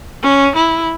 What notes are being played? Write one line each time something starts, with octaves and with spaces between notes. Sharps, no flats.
C#4
E4